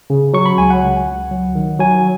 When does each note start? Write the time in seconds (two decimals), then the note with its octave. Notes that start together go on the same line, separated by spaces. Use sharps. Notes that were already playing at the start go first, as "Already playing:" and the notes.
0.10 C#3
0.33 F#3 C#6
0.46 B5
0.58 C#2 G#5
0.70 F#5
0.83 C#2
1.06 C#2
1.31 F#3
1.55 D#3
1.80 F#3 G#5